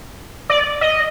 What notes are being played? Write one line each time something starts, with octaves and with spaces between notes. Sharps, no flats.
D5
D#5